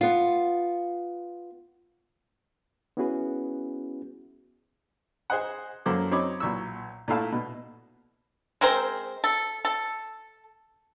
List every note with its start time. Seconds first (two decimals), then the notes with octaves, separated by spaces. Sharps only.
0.01 B3 F4
2.97 B3 C#4 E4 F#4 G#4 B4
5.30 G#4 C5 D#5 F#5
5.86 F#2 A#3 A4 C5 D6
6.11 F#3 C4 C#5 D#5 B5 D6
6.40 B1 A#2 C#6 E6
7.08 A#2 A3 E4 F5 A5
7.32 B2
8.61 G#3 C4 A#4 C5
9.24 A4
9.65 A4